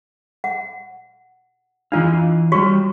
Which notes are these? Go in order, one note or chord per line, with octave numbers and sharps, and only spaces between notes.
F#5
E3 D4 F4 D#5 F5
G3 F#4 C#5 C#6